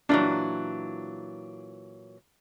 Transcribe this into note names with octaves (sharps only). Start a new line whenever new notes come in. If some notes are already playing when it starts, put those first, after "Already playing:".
A#2 E3 F#3 D4